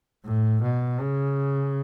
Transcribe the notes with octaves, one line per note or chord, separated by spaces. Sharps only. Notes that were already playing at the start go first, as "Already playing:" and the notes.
A2
B2
C#3